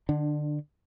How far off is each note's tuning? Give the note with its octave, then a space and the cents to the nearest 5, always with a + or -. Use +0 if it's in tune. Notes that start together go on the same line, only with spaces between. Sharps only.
D3 +25 D4 +0